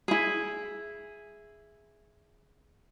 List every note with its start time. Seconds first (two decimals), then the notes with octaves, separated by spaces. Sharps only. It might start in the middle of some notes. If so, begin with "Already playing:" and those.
0.08 E4 G#4